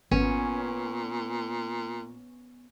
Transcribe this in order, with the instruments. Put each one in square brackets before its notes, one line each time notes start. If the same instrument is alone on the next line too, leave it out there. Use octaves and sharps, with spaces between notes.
[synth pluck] G#1 [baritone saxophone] A#2 [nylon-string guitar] B3 [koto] C#4